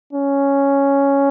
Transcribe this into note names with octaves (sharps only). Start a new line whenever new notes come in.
C#4